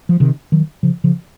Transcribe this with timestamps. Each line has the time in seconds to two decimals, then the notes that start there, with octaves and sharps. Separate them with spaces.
0.09 F3
0.20 C3 D#3
0.52 D#3 F#3
0.83 C#3 F3
1.04 C#3 F3